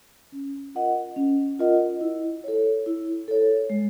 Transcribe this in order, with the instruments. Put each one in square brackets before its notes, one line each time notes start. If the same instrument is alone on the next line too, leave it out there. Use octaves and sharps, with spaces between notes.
[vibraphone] C#4
F4 A#4 D#5 F#5
C#4
F4 A#4 D#5 F#5
E4
A4 C#5
E4
A4 C#5
G#3